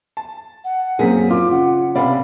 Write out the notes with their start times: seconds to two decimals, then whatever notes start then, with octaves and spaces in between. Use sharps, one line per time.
0.17 A5
0.64 F#5
0.99 F#2 A#3 C4 C#4 G#4 B6
1.30 F4 D6
1.51 C#3 F#5
1.95 C2 C3 B3 C#4 D5 F5 B5